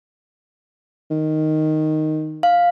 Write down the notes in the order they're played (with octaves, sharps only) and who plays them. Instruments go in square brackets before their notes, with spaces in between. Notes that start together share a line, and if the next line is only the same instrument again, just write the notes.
[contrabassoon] D#3
[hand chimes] F5